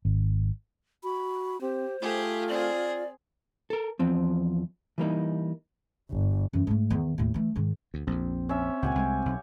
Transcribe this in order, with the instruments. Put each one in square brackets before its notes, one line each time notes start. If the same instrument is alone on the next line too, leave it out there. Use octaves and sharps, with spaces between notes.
[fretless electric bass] G#1
[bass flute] F#4 [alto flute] B5
[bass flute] C4 [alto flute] G4 [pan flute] C5
[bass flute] A3 [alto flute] F4 [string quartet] G4 G#4
[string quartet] C4 G#4 [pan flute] D5
[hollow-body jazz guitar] A4 A#4
E2 F3 C4
E3 G3 A#3 D#4
[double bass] G1
[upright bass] F#2 E3
G#2 A3
E2 D#3
D#2 A2
E3 A3
G#2 D#3
[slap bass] D2
[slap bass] A#1 F2 [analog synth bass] C4
[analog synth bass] C4 [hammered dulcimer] C#4 E5
[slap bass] C#2 A#2 [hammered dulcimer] G4 F#5 G#5
[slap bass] C2 G#3
B1